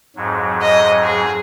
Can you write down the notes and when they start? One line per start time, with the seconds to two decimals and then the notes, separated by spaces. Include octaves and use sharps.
0.16 F2 G#2 F#3
0.62 D#5
1.03 G#4